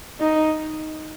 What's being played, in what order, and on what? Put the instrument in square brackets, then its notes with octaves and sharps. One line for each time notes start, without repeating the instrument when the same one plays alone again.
[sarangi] D#4